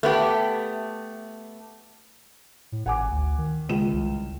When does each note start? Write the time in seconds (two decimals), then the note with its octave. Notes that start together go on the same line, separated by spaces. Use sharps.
0.03 A3 B3 G4
2.72 A2
2.86 G#1 F#5 G#5 D6
3.11 D2
3.38 D#3
3.69 C#2 E7
3.93 C2